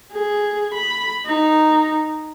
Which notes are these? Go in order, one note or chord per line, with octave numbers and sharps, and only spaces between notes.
G#4
B5
D#4